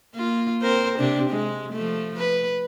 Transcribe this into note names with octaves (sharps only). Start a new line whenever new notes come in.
A#3 F4
C4 A#4 C5
C3 D4
G#3
F3 A3
B4